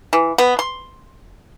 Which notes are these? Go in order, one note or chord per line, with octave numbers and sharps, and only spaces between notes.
E3
B3
C6